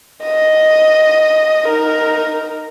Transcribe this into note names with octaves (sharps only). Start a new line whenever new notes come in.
D#5
D#4 A#4